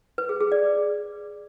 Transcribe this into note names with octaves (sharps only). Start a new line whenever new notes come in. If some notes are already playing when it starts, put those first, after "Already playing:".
B4
G#4
G#4
D5